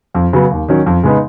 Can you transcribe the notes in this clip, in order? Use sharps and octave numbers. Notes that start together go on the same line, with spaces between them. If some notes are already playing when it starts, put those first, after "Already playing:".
F2
C#3 F#3 B3
D#2
D#3 F#3 C#4
F2
C#3 G#3 B3 D#4